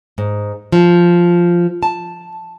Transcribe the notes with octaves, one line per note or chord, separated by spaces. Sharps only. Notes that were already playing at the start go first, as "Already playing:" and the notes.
G#2
F3
A5